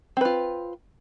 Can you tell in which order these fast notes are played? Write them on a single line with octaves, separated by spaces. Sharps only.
C4 B4 F4